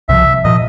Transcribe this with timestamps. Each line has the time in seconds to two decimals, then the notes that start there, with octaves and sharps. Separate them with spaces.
0.09 C2 C3 F3 E5
0.44 A#2 F3 D#5